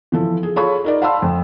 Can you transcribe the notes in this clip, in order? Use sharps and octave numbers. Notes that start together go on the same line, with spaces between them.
E3 F3 A4
G#4
F4 G#4 A4 C#5 B5 C#6
D#4 A#4 D5
F5 F#5 A5 B5 C6 E6
F2